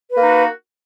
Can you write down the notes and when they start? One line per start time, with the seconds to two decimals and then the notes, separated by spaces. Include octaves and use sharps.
0.12 B4
0.17 A#3
0.22 D#4
0.27 F#4